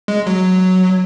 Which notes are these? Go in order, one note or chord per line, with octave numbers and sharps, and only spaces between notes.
G#3
F#3